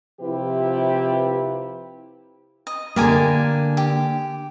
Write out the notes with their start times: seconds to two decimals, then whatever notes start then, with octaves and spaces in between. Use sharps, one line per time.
0.21 C3 F3 E4 F4 G4 B4
2.67 D#5
2.96 D3 A#3 G4 A#4 G#5
3.77 G4